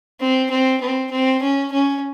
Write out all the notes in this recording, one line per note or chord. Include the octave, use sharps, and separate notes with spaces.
C4
C4
C4
C4
C#4
C#4